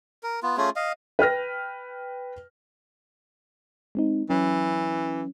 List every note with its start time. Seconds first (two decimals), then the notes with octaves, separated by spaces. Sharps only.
0.23 A#4
0.43 B3 F4
0.57 A3 C#4 F4 G#4
0.76 D#5 F5
1.19 B4 G5 F6 A#6
3.95 G#3 C4 D#4
4.30 E3 F#3 C#4